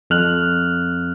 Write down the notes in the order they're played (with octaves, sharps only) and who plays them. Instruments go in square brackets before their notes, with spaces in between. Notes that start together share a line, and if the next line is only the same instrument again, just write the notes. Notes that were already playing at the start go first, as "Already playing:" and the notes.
[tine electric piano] F2 F6 F#6